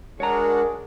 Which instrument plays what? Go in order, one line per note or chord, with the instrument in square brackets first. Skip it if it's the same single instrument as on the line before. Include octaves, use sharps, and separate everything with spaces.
[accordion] G#3 D4 F#4 [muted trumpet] G#4 [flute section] A#4 [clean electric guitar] C#5 A#5